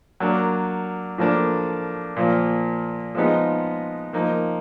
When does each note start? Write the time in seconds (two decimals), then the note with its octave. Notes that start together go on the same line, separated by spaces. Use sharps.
0.20 F#3 A#3 D4
1.18 A2 F3 A#3 D4
2.16 A#2 F3 A#3
3.15 F3 G#3 B3 D#4
4.13 F3 A#3 D#4